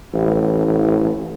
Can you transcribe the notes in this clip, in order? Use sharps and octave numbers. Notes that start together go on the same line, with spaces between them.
A1